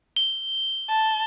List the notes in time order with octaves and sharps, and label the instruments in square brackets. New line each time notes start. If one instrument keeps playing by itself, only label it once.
[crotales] G7
[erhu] A5